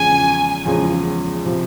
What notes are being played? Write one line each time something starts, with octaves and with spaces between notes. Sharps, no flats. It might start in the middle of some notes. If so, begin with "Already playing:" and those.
Already playing: E2 C#3 F3 G#3 C#4 G#5
E2 C#3 F3 G#3 C#4
C3 F3 C4 G4